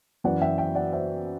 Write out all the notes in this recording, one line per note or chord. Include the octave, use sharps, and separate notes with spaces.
F#2 E3 D5 F#5
E5 G5
E5 G5
D5 F#5
C5 E5